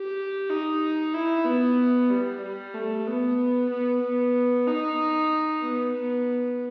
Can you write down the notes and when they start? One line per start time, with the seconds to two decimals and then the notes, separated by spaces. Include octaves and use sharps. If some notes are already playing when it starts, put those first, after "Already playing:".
Already playing: G4
0.49 D#4
1.13 E4
1.45 B3
2.09 G3
2.42 G3
2.74 A3
3.06 B3
3.70 B3
4.02 B3
4.66 D#4
5.62 B3
5.94 B3